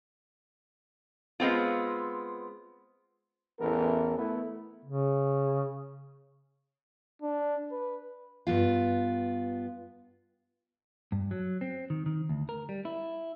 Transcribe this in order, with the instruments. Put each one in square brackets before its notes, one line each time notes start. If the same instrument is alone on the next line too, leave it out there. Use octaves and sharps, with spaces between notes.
[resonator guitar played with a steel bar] G#3 B3 C4 F4
[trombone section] A1 E2 E3 B3 A4 A#4
A3 B3 E4
[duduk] C#3
[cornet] D4
B4
[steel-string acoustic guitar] G2 B3 F4
[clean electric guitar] G2
F#3
C4
D#3
D#3
D2
A#4
G3
E4